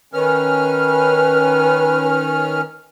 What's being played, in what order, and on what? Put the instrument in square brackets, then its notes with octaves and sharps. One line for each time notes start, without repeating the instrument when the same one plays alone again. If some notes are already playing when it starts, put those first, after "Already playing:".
[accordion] D#3 C#4 F6 [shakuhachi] B4